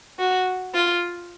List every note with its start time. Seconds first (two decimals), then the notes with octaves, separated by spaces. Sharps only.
0.19 F#4
0.74 F4